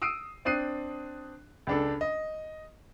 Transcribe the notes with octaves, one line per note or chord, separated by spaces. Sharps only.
D#6 E6 C7 D7 D#7
C4 D4 D#6 F#6 C7 D#7
C#2 D4 A4
D#5